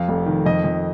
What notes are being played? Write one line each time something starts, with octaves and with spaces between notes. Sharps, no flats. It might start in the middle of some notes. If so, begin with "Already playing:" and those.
Already playing: F2 F5
F1
D#3
F2 D#5
F2